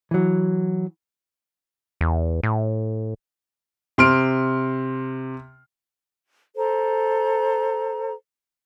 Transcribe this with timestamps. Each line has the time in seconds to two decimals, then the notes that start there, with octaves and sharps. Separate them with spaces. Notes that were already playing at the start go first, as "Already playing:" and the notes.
0.11 E3 F#3
2.01 E2
2.43 A2
3.98 C3 C6 F6 D7
6.57 A4 C5 A#5